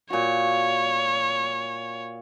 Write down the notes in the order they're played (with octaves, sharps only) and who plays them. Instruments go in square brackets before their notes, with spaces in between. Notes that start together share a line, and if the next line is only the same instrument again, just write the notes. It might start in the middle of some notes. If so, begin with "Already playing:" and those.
[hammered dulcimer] A#2 F#4 [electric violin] C#5